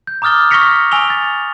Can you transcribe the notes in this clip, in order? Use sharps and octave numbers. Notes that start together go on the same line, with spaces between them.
G6
A#5 D6 D#6 F6 A6 G7
C#6 F6 A#6 B6 C#7 F7
G#5 C#6 E6 F7 G7
A6